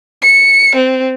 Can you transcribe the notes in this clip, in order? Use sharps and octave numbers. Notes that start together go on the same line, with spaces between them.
C#7
C4